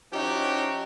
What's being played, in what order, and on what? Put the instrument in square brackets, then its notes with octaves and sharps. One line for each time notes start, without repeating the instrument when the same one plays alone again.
[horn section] F3 C#4 D#4 E4 F#4 G4